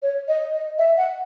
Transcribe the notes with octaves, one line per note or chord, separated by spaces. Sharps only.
C#5
D#5
D#5
E5
F#5